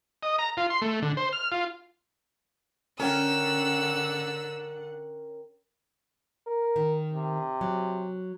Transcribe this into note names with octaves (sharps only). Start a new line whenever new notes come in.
D#5
A#5
F4
C6
A3
D3
C5
F6
F4
D3 C#4 A#4 F#5 G5 E6
A#4
D#3
C3
F#3